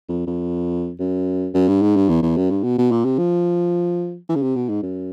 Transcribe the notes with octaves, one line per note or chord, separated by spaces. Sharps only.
F2
F2
F#2
F#2
G2
G#2
G2
E2
E2
F#2
G2
B2
B2
A#2
C3
F3
E3
C#3
C3
B2
G#2
F#2